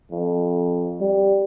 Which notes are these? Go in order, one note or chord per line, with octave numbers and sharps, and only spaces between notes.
F2
G3